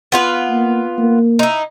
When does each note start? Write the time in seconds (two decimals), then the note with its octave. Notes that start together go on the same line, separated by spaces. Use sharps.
0.12 B3 F4 B4
0.50 A#3
0.98 A#3
1.39 D#4 E4